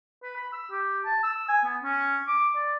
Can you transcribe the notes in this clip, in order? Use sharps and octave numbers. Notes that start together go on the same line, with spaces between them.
B4
B5
E6
G4
A5
E6
G#5
B3
C#4
D6
D5